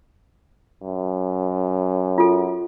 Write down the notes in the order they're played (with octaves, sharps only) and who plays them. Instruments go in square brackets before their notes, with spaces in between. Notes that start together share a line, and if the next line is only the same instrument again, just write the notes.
[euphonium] F#2
[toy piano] F4 A4